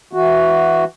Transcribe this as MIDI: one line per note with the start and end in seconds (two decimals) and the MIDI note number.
0.13 0.84 52
0.13 0.84 66